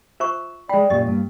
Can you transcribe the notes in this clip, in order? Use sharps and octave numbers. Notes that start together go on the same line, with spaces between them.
F4 C5 E5 C#6
G#3 D5 G5 B5
F#2 A#2 G4 D#5
G2 A#3